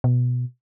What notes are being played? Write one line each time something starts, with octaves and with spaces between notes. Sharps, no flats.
B2